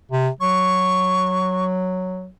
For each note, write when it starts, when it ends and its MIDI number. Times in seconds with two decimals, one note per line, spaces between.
0.11 0.29 48
0.41 2.30 54
0.41 1.65 85